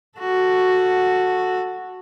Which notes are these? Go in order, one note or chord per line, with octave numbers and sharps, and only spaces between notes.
F#4 A4